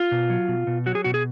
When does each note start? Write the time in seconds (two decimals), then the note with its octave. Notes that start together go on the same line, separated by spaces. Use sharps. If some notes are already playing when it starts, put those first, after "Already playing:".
Already playing: F4
0.12 B2
0.30 F#3
0.48 B2
0.67 B2
0.86 F#3 F#4
0.95 G#4
1.04 B2 F#4
1.14 G#4